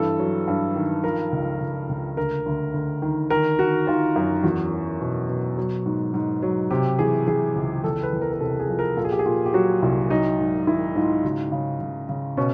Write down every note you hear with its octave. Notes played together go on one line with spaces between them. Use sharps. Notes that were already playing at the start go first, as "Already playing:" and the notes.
Already playing: G2 E3 A4
F#3
G2
D#3
F3 A#4
C#2
C#2
C#2
D2 A#4
D2
D2
D#3
D#3 A#4
D#3 F#4
D#3 F4
F#2
E2 F#4
F#3
B2
B2
F#3
G#2
G#2
F#3
C3 G4
E3 G#4
E3 G#4
C#2
E2 A4
B4
E2
A#4
A#4
C3 A4
G#4
F3
A#4
A#2 A4
G#4
G4
G#4
A#2
G4
F#3 F#4
C2
F#3 D#4
G#2
D#3 E4
G#2 F4
C#3 F#4
C#3
C#3
C#3
B2 C#4